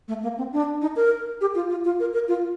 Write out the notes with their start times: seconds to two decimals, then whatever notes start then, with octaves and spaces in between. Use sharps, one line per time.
0.08 A3
0.23 A#3
0.38 C4
0.52 D4
0.82 D#4
0.96 A#4
1.41 G4
1.55 F4
1.70 F4
1.85 F4
2.00 A#4
2.14 A#4
2.28 F4